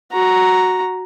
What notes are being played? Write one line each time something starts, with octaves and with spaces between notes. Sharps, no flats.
F#4 A#5